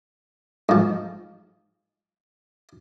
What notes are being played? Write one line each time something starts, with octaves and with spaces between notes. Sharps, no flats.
G#2 F3